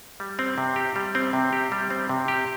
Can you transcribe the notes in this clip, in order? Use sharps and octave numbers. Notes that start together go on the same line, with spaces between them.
G3
C4
C3
G4
G3
C4
C3
G4
G3
C4
C3
G4